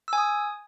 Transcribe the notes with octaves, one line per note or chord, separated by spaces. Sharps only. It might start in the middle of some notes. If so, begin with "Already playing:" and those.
G#5 D#6 E6